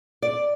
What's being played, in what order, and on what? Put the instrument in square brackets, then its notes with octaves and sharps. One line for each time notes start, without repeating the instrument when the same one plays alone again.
[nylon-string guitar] D5